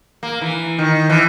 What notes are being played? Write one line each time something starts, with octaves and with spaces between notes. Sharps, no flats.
A#3
E3
D#3
E3